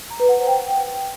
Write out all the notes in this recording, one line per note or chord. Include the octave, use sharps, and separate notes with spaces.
A#5
B4
F#5
C5
G5